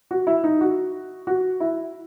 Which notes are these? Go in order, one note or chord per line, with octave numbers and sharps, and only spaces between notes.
F#4
E4
D#4
F#4
F#4
E4